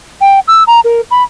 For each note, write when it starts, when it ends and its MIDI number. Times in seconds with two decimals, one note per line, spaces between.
0.21 0.40 79
0.48 0.63 88
0.67 0.80 82
0.84 1.01 70
1.11 1.23 83